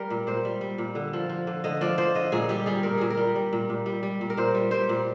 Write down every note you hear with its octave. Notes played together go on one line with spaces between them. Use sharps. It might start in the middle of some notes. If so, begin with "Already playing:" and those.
Already playing: G3 A#4
A#2
A#2 C5
G3
G3
A#2
D3
F3
F3
D3
D3 D#5
F3 D5
F3 C5
D3 D#5
A#2 G#4
G3 G4
G3 G#4
A#2 A#4
A#2 G#4
A#4
G3
G3
A#2
A#2
G3
G3
A#2
A#4
A#2 C5
G3
G3 C5
A#2